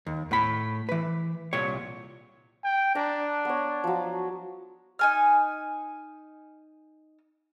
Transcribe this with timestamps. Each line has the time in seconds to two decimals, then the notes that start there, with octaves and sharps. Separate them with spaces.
0.07 D#2
0.31 A2 B5
0.89 E3 B4
1.53 C2 A#2 C#5
2.63 G5
2.95 D4 A#5
3.45 B3 C#5
3.84 F3 F#3
4.99 D#4 G#5 F6